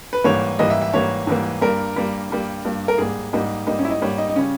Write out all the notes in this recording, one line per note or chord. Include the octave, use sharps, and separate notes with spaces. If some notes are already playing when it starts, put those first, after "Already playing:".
B4
G#2 E3 G3 A#3 C#5
G#2 E3 G3 A#3 D#5
E5
E5
G#2 E3 G3 A#3 C#5
G#2 E3 G3 A#3
G2 G3 A#3 A#4
G2 G3 A#3
G2 G3 A#3
G2 G3 A#3
A#4
G#2 G3 A#3 G#4
G#2 G3 A#3 D#4
G#2 G3 A#3 D#4
C#4
E4
D#4
G#2 G3 A#3 C#5
D#4
D#4
C#3 G3 C#4